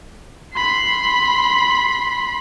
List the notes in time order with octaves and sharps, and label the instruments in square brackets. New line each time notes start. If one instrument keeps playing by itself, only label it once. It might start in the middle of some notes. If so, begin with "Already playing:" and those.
[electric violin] B5 C6